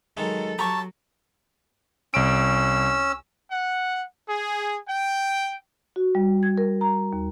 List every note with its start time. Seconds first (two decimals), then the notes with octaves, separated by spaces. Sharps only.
0.17 D#3 F#3 G#3 A4
0.59 F#3 G4 A5 A#5 C#6
2.14 C2 C#4 E6 D7
3.52 F#5
4.29 G#4
4.88 G5
5.96 F#4
6.15 G3
6.43 G#6
6.58 A#4
6.81 A#5
7.13 D#2